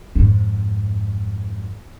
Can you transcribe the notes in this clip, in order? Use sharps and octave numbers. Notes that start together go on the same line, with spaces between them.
F2 G#2